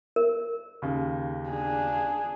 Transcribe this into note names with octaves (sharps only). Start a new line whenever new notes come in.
A#4
D#2 C#3
D4 G#4